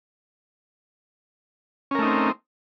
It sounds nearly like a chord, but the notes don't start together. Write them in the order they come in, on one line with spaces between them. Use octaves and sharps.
C#4 A#4 A3 D#4 C4